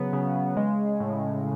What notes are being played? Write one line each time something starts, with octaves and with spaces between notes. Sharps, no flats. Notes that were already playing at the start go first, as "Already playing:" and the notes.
Already playing: C#3 F#3 B3
C#3
G#3
A2